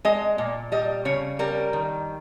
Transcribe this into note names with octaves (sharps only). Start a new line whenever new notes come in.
G#3 D#5
A#2
G3 D#5
C#3 C#5
G3 A#4
D#3